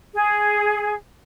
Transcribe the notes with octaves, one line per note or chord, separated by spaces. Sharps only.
G#4